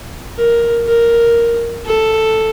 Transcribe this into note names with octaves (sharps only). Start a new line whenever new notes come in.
A#4
A#4
A4